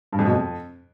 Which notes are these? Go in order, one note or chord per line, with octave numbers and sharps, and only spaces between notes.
G2
F2
B2
F2